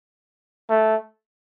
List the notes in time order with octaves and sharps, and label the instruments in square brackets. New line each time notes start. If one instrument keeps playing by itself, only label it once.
[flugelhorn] A3